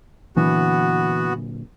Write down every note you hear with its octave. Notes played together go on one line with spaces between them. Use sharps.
A#2 D3 E3 F#3 B3 F#4